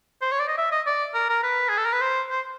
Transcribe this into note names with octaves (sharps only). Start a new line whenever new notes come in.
C5
C#5
D5
D#5
E5
D#5
D5
A#4
A#4
B4
G#4
A4
A#4
B4
C5
C5